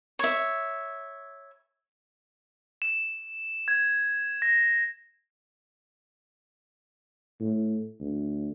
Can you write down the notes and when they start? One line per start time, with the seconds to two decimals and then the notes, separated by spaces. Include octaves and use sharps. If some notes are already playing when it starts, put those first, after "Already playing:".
0.19 C#5 E5
2.82 E7
3.68 G#6
4.42 A#6
7.40 A2
8.00 D2